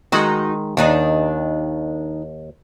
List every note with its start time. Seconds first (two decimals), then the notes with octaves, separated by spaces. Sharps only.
0.12 D#3 G#3 D#4 F#4
0.77 D#2 D#3 D4 D#4